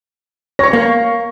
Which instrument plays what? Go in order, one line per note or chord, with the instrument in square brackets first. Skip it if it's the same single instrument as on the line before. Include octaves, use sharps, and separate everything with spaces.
[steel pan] C#5 [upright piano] C#6 A#6
[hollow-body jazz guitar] A#3